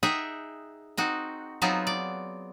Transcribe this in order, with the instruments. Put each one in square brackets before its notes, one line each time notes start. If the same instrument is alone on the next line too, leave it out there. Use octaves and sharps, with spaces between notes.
[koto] D#4 G#4 E5 F#5 G5
C4 D#4 F#4
F#3 B3 C4 D#4 F4 G#4
D5